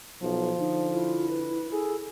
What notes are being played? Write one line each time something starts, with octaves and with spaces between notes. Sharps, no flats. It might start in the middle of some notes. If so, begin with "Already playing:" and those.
B1 F3
D3 D#4
E4 F4
B4
G#4 A4